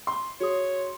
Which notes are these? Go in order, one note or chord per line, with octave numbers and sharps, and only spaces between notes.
C6
F#4 G#4 C#5 D#6